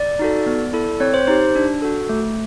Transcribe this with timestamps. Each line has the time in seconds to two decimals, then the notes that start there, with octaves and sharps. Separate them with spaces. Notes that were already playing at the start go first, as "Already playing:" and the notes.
Already playing: D5
0.19 D#4 F#4 A4
0.46 B3
0.73 E4 A4
1.00 C4 C#5
1.14 C5
1.27 D#4 G4 C5
1.55 D4
1.82 F#4 A4
2.09 A3